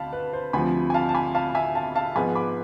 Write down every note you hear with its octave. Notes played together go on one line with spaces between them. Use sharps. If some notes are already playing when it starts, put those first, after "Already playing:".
Already playing: D2 F5 A5 B5
B4
C5
D2 C3 F3 G#5 B5
G#5
F5 A5
A5
G#5 B5
F5 A5
E5 G#5
F5 A5
F5 A5
G#2 F3 B3 F4 G#5 B5
B5 D6